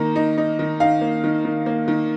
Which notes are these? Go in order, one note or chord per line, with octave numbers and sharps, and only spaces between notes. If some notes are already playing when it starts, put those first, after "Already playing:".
Already playing: D#3 A#3 D#4 A#5
D#4
D#4
D#3
D#4 F5
A#3
D#3
D#3
A#3
D#3